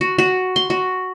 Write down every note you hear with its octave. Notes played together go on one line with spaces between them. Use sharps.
F#4
F#4
C6
F#4